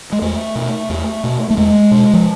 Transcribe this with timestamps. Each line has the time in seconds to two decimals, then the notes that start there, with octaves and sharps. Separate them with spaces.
0.12 G#3
0.22 E2 A3
0.55 B2
0.89 E2
1.24 B2
1.50 A3
1.57 E2 G#3
1.91 B2
2.13 F3